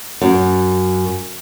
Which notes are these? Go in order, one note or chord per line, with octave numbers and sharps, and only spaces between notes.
F#2